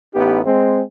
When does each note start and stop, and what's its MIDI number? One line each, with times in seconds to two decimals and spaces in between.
0.15 0.40 33
0.15 0.40 59
0.15 0.40 63
0.15 0.40 67
0.46 0.82 56
0.46 0.82 60